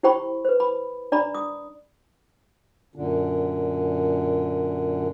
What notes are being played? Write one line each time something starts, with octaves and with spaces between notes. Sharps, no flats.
E4 G4 C5 G5 B5 C#6
B4 C5
B5
D4 D5 A#5 B5
D#6
F#2 A#2 D3